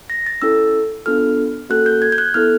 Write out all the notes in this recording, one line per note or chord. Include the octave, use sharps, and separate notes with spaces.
A#6
A6
C#4 E4 A4 E6
B3 D4 F4 A4 F6
A#3 C#4 F#4 A4 F#6
G6
G#6
G6
F#6
B3 E4 A4 F6